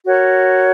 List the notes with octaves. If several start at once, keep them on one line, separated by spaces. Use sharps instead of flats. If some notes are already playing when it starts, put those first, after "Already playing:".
F#4 A#4 C#5